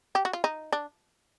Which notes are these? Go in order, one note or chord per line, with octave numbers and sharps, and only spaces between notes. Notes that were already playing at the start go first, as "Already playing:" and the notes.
G4
F#4
F4
D#4
D4